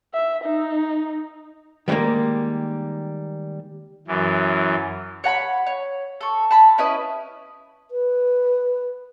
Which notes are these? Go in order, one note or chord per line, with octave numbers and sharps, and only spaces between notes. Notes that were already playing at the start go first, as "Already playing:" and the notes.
E5
D#4
D#3 E3 G3 G#3 A#3
F#2 E3
C#5 F#5 A#5 B5
C#5
A4 C#6
A5 B5
C#4 E4 B4 D#5
B4